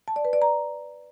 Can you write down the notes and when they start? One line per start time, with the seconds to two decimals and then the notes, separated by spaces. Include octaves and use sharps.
0.08 A5
0.16 D5
0.25 B4
0.33 D5
0.42 A#5